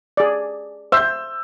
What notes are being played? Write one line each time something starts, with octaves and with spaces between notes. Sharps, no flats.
G#4 D5
C5 E5 E6 G6